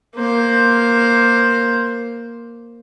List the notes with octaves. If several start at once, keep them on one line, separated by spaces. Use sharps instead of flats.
A#3 C5